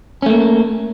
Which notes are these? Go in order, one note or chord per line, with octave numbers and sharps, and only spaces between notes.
A3 A#3 C#4